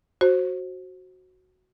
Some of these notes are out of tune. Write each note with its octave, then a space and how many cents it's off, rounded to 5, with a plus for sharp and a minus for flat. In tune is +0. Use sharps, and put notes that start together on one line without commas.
F#4 +0 C5 +20